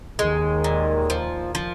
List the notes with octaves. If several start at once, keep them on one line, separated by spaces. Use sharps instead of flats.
D#2 D#3 G#3
A#2
F3
F3